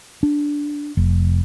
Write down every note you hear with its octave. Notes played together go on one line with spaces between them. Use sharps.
D4
F1